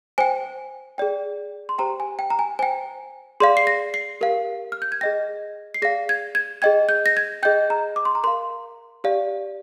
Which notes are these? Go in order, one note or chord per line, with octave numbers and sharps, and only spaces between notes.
C5 G5 G#5
G#4 D5 G5
C6
G4 C5 G5 A#5
G#5
G5
A#5
G#5
C5 G5 G#5
G#4 D5 F5 C6
C7
A#6
C7
G4 A#4 F5
F6
G6
G#6
G#4 D#5 G5 A#6
C7
G#4 D5 F5 A#6
G#6
G#6
G#4 D#5 G5 G#6
G6
A#6
G#6
G#4 D#5 G5 G6
A#5
D6
C6
A#5
A#4 F5 C6
G4 D5 F5